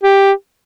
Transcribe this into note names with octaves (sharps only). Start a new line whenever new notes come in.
G4